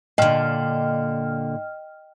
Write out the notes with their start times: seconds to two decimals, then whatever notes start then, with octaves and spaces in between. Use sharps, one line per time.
0.18 A#2 D3 D#5 G5 F6